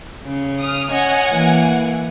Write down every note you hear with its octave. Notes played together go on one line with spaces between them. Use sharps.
C#3
D#6 F6
C#5 D#5 F#5 G#5
E3 A#3